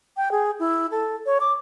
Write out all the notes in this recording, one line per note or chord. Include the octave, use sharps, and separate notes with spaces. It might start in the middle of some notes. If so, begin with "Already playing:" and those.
G5
G#4
E4
A4
C#5
D6